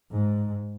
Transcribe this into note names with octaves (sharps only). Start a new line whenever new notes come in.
G#2